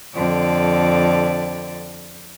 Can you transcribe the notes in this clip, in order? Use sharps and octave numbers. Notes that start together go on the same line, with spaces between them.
F2 D3 D5